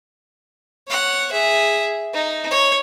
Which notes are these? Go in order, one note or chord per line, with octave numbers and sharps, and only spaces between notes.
C#5 F#5
G#4 E5
D#4
C#5